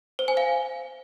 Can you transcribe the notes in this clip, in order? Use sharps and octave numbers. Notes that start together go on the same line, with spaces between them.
C5
G#5
F5